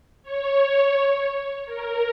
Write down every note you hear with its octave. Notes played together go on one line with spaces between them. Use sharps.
C#5
A#4